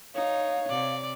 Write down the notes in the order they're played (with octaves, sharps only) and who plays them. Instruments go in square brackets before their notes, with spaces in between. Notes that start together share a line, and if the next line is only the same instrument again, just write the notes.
[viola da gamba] D#4 [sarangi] C#5 [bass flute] F5
[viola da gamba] C3 [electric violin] D5